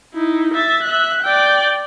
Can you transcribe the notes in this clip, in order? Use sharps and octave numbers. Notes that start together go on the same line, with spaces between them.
D#4 E4
E5 A6
E5 F#6
D5 G5